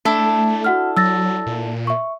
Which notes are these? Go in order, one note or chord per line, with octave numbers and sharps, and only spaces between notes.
A3 D4 E4 A4
F#4 F#5 F6
F#3 E6 A6 A#6
A#2
E5 C#6